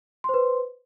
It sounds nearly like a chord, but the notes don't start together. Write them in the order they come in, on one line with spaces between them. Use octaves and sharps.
C6 C5 B4